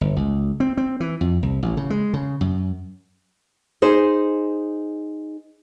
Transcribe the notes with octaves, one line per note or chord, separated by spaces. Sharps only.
G1
C#2
C4
C4
E3
F2
C2
A1
C#3
G#3
C#3
F#2
D#4 G#4 C5